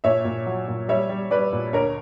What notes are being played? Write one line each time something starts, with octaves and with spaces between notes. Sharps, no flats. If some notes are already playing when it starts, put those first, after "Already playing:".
A#2 C#5 E5
A#2
F#3
A#2
G3 C#5 E5
G3
G3 B4 D5
A#2
D2 A#4 C#5